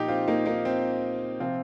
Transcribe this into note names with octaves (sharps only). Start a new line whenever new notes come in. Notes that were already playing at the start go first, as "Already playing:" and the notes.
Already playing: A#2 F3 D#4 G4
C4 F4
A#3 D#4
A#3 D#4
C4
C3 F3 C4 F4